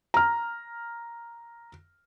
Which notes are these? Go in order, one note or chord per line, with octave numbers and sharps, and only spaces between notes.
A#5 F6